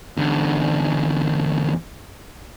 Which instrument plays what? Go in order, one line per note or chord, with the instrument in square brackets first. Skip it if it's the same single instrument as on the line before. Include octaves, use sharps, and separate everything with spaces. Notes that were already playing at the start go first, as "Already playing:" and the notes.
[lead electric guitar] E2 D3